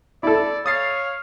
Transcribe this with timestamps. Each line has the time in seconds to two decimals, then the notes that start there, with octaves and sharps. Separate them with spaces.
0.23 E4 A4 D5
0.66 C#5 F5 D#6 A6 C7